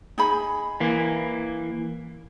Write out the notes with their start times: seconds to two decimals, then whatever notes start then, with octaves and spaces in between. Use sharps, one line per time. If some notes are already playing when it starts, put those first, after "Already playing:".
0.18 D#4 G#4 B5
0.80 E3 A#3